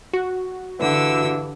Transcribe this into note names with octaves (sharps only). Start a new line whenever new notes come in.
F#4
G2 D3 E3 E6